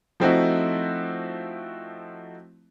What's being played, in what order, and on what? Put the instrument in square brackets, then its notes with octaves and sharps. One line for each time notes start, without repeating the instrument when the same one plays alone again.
[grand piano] F3 A3 C4 D#4 E4 F#4